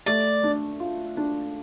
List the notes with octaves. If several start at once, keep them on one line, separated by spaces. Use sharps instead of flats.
A3 D5
D4
F4
D4